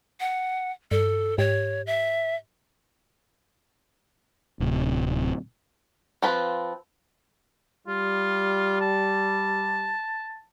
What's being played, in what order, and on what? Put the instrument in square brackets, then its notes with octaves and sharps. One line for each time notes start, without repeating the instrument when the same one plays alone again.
[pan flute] F#5
[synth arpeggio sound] G2 [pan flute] A4
[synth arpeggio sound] G#2 G4 [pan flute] C#5
[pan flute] E5
[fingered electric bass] D1 C3
[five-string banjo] F3 C4 F4 B4
[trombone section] G3 [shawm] F4
[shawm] A5